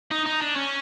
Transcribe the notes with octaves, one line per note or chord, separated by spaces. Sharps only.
D#4
D#4
D4
C#4